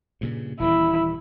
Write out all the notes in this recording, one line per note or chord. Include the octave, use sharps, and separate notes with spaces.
G2 A#2 C#3
D#1 E3 G3 E4